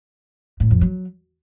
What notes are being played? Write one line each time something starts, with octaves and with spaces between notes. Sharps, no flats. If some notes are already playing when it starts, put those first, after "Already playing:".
A2
F2
F#3